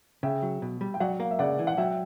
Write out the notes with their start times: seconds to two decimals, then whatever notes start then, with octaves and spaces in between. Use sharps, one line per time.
0.23 C#3 E5 G5
0.43 F#3
0.62 B2
0.81 G3
0.94 G5
1.00 F#3 D5 F#5
1.20 A#3
1.31 E5
1.39 C#3 D5 F#5
1.59 E3
1.67 F#5
1.77 F#3 E5 G5